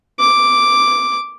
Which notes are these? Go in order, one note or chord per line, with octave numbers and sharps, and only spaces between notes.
D6